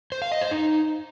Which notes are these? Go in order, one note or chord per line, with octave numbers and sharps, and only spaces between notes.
C5
F5
D#5
C5
D#4